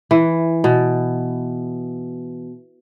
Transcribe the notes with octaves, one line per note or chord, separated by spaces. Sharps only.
E3
B2